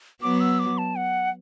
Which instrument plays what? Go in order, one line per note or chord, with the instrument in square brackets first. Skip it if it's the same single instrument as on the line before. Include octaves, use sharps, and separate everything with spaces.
[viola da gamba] F#3 B3 [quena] D6
[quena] E6
D6
A5
F#5